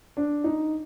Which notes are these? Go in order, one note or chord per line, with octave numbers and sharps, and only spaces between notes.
D4
D#4